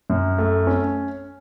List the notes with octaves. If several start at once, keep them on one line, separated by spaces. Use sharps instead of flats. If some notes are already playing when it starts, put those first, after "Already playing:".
F#2
A3
C#4